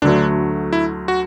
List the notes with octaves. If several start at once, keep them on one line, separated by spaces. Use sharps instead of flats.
D2 D3 F#3 A3 D4
E4
F#4